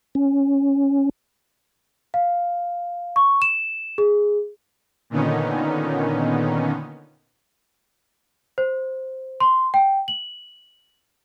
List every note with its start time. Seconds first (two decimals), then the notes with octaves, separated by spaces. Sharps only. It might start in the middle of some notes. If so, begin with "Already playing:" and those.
0.15 C#4
2.14 F5
3.16 C#6
3.42 E7
3.98 G#4
5.10 A#2 D3 D#3 B3 C#4 D#4
8.58 C5
9.40 C6
9.74 G5
10.08 F#7